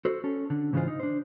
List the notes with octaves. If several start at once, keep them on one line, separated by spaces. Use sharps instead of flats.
F#4 A4 C5
C#4 A4
D3
G#2 C#3 E3 G#3 F4 C5
D#4
D4 C5